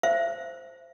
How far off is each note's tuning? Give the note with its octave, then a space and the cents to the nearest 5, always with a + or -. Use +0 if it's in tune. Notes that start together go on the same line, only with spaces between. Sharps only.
C5 -5 E5 +40